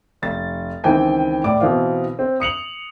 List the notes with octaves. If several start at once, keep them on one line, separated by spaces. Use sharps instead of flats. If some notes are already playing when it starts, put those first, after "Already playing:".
F1 A6
C#2 D#3 E3 C4 G5 G#5
A2 D5 D6
B2 E3 C4 F4
C4
D#6 C#7 F7 F#7